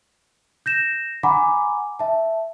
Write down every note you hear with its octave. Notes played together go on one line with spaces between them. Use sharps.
G6 A#6 E7
F#5 G#5 A#5 B5 D6
E5 A5